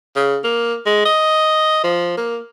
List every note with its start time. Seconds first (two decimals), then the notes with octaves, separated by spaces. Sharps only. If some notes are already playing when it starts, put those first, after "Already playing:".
0.16 C#3
0.44 A#3
0.86 G#3
1.05 D#5
1.84 F3
2.17 A#3